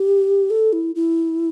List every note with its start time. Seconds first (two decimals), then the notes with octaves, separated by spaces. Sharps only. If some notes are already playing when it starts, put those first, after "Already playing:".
Already playing: G4
0.50 A4
0.73 E4
0.95 E4